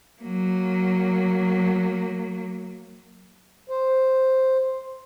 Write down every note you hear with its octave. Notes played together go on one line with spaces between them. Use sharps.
F#3 A#3
C5